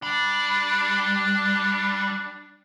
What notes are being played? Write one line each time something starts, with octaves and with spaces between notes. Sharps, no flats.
G3 D4